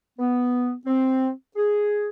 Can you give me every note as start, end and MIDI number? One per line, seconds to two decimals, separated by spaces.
0.18 0.72 59
0.86 1.29 60
1.56 2.09 68